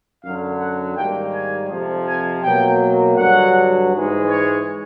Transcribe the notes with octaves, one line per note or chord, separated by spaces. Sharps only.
F#2 D3 F#3 F5
F#5
G#2 D#3 G3 A#3 G5
G#5
F2 C3 F3
G#5
B2 F#3 A#3 G5
G2 D3 F#3 F#5
G#2 E3 G#3
C#5